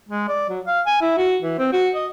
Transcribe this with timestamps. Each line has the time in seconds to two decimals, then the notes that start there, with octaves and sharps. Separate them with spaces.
0.09 G#3
0.28 D5
0.49 F#3
0.66 F5
0.86 G#5
1.01 E4
1.18 F#4
1.42 E3
1.59 C4
1.73 F#4
1.95 D#5